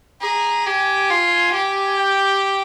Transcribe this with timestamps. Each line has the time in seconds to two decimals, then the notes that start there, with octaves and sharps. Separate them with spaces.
0.22 G#4 A#5
0.66 G4 G#5
1.10 F4 G#5
1.53 G4
1.97 G5